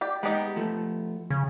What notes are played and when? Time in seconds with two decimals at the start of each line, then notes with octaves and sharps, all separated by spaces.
0.01 G4 D5
0.23 G#3 B3 D#4 G4
0.56 F3 A3
1.30 C#3